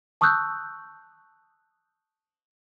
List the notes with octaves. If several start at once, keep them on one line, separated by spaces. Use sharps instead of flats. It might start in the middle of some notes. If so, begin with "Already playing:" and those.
A5 C#6 D#6 E6 F#6 G6